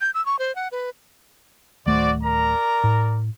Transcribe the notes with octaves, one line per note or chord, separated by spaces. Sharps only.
G6
E6
C#6
C5
F#5
B4
D1 D#3 A3 F#4 C5 D5
A#4 D5 A#5
A2